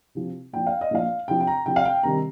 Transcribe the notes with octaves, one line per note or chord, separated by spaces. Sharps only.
C3 F3
A#2 F3 G5
F5
D#5
A#2 F3 F5
C3 F3 G5
G5
A#5
C3 F3 G5
F5
G5
C3 D#3 G3 A#5